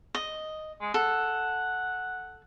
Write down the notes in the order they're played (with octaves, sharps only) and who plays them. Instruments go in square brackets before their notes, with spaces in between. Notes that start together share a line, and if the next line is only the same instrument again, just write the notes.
[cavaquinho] D#5
[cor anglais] G#3
[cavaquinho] A4 [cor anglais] F#5